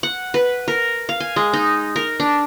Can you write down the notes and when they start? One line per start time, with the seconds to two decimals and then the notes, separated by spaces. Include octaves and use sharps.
0.03 F#5
0.34 B4
0.68 A#4
1.09 F5
1.20 G#5
1.36 G#3
1.53 D#4
1.96 A#4
2.20 D4